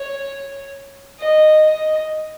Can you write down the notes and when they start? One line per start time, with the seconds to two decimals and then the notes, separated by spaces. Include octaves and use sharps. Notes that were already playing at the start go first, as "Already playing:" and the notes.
Already playing: C#5
1.20 D#5
1.66 D#5